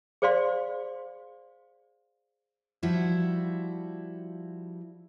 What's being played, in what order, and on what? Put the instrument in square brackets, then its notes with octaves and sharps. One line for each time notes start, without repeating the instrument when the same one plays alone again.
[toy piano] G#4 C5 D5 F5 C6
[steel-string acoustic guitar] F3 G3 E4 F#4